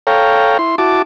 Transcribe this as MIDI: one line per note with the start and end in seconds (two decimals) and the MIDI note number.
0.07 0.58 69
0.07 0.58 73
0.07 0.58 77
0.07 0.58 79
0.07 0.58 82
0.59 0.76 64
0.59 0.76 84
0.78 1.02 64
0.78 1.02 66
0.78 1.02 81
0.78 1.02 86